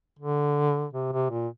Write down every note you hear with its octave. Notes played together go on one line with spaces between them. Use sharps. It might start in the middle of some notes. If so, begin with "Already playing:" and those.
D3
C3
C3
A#2